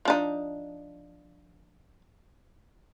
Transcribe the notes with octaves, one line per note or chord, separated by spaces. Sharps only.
F3 D4 D#4